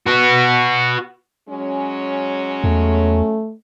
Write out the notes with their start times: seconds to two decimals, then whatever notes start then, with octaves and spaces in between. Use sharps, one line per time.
0.08 F#4 B4
1.49 F#3 G#3 C#4
2.64 E2 A3